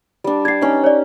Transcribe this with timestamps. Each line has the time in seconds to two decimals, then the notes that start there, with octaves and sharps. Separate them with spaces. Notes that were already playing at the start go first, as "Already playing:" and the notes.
0.24 G3 D4
0.45 G4 D5 G#6 C7
0.61 C#4 D#4
0.84 C#5 D5